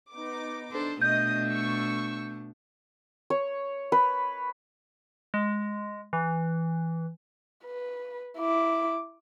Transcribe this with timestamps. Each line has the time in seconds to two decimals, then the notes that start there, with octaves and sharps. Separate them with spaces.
0.12 B3 D#4 D6
0.72 D4 A4 C5
1.01 B2 A3 D4 D#5 D#6 G6
1.48 C#6 E6
3.30 C#5
3.92 B4
5.34 G#3
6.13 E3
7.65 B4
8.39 E4 D6